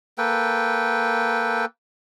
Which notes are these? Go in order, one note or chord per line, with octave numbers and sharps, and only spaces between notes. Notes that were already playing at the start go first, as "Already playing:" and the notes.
A#3 A4 B4 G5